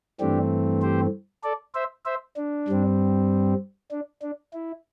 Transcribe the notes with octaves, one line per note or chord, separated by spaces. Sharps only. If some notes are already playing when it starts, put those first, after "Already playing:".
G2 E3 A3 C4 D4 G4
G4 C5
A4 D5
C5 E5
C5 E5
D4
G2 G3 C4
D4
D4
E4